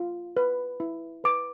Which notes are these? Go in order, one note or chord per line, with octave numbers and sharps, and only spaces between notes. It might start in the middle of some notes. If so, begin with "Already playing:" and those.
Already playing: F4
B4
E4
B4 D6